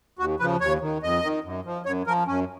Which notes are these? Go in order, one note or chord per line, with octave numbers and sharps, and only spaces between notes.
D#2 F#4
C#3 F3 B4
D#2 C#5
D#3
F2 D#5
D#3
F#2
F3
F#2 C#5
F3 A#4
F#2 C#4